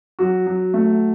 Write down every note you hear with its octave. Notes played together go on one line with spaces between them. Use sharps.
F#3 F#4
F#3
A3